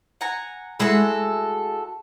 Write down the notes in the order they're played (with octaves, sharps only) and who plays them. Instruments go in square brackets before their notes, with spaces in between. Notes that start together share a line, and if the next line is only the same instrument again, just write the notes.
[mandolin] F#5 G#5 A#5
[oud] G#3 E5 [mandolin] E4 F#4 A4